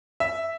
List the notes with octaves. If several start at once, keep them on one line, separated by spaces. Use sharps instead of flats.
E5